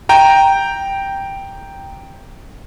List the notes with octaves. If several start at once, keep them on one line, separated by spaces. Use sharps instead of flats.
G5 A#5